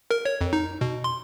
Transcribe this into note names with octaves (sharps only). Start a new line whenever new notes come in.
A#4
C#5
F2
D#4
B2
C6